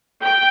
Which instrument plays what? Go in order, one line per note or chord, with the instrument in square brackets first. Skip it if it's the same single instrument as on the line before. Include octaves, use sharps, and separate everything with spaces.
[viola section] G5